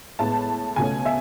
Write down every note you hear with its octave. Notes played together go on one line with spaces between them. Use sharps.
A2 G#3 B3 A5
C#2 B2 A3 C#4 G#5
E5